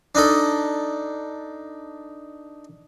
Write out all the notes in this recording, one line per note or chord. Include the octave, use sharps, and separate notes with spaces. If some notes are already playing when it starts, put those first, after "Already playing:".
D4 D#4 A4